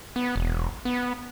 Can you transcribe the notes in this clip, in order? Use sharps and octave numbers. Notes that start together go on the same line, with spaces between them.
B3
E1
B3